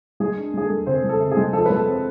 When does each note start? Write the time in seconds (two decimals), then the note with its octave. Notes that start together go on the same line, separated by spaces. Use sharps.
0.20 G#3 G#4
0.37 D4
0.54 G#3 G#4
0.65 G#3 A4
0.86 C3 C4 C5
1.03 G#3
1.09 A4
1.20 C3
1.31 G#4
1.37 G#3
1.53 F3 A4
1.66 G#3 B4
1.75 A4
1.87 C4